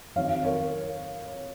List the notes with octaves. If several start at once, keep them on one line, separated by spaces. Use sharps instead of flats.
F2 D#3 F#3 C#5 F5
A#4 C#5